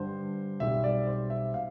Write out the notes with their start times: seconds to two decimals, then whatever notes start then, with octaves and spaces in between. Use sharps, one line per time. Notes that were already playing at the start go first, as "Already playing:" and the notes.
Already playing: G2 D3 G3 C5
0.60 B1 B2 G3 C4 E5
0.84 D5
1.07 C5
1.30 E5
1.54 B2 F5